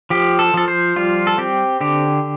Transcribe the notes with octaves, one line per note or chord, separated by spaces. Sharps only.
F3 G4
A4
F3 A4
C5
G3 F4
A4
C4 G4
D3 G4